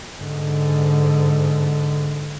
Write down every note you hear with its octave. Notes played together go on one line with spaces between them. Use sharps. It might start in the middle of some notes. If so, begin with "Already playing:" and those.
G#2 D3